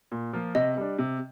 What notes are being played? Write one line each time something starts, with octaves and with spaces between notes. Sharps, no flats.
A#2
F3 A#3 F4
C3 D#5
G3 D4
C3